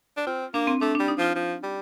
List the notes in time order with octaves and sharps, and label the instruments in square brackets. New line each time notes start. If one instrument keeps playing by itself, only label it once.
[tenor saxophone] D4
[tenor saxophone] C4 [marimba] F4
[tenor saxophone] A#3 [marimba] D4
[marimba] C4
[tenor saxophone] A3 [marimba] D4
[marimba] D4
[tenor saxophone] G3
[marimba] D#4
[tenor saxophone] F3 [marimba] F4
[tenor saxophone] F3
G3